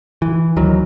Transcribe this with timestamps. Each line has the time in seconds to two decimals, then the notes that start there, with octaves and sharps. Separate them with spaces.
0.22 E3
0.56 D2 D#3 E3 F#3